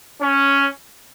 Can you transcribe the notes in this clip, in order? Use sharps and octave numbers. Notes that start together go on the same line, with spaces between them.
C#4